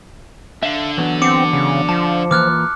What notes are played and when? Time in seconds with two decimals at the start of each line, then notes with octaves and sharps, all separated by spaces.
0.63 D3 E5 F5
0.97 E3 F#3 B3
1.22 C4 D6 C#7
1.53 C#3
1.89 F3 A5
2.31 E3 A#3 F4 D6 F6 F#6